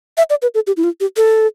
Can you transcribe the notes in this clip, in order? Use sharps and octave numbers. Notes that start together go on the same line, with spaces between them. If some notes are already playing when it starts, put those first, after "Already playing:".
E5
D5
B4
A4
G4
E4
F4
G4
A4